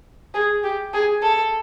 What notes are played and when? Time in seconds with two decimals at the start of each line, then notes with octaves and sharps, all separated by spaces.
0.34 G#4
0.64 G4
0.93 G#4
1.22 A4